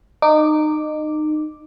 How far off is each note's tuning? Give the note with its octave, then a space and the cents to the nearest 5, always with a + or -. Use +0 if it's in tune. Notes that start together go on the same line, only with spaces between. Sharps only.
D#4 -25 D6 +0